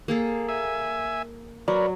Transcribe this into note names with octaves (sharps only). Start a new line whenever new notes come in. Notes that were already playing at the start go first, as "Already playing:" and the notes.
A#3 G#4 A4
E5 G#5
F#3 A#4 B4 C#5 D5